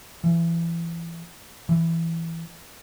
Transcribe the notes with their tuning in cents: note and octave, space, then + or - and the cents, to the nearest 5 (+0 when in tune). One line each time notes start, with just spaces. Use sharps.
E3 +30
E3 +5